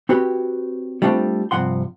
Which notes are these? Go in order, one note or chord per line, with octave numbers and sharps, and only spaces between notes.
C4 F#4 G4 B4 C#5
G3 A3 C4 D4 F4 D5
G2 C3 F3 F#5 C6